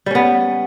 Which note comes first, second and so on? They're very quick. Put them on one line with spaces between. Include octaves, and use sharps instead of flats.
G3 C#4 B3